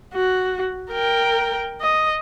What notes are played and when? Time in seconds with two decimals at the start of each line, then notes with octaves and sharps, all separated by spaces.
0.14 F#4
0.92 A#4 G5
1.81 D#5